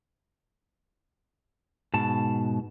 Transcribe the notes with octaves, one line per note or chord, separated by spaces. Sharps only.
G#2 B2 A5